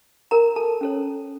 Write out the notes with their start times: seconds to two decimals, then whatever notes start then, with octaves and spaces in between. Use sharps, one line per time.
0.31 A#4 A#5
0.56 A4 A5
0.81 C#4 A4 C#5